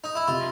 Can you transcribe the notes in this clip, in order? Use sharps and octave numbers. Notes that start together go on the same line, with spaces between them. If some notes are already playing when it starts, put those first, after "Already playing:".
D#4
E4
C3 F4